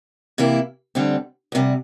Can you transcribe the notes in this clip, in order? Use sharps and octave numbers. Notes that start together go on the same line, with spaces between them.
C3 E3 A#3 E4
D2 D3 G3 C4
D2 C3 G3